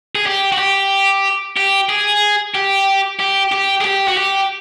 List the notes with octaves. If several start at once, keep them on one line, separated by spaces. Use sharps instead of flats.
G#4
G4
F#4
G4
G4
G#4
G4
G4
G4
G#4
G4
F#4
G4